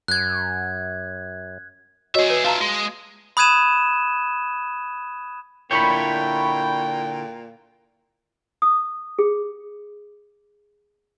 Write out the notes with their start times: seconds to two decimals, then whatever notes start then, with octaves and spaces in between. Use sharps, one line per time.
0.08 F#2 F#6 G#6
2.15 F#4 G#4 C#5 D#5 E5
2.30 B4
2.44 F4 E5 F5 A5 A#5
2.61 G#3
3.37 B5 D#6 F#6 G#6 D#7 E7
5.71 A#2 D3 E4 C#5 G5 B5 C#6 G6
8.62 D#6
9.19 G#4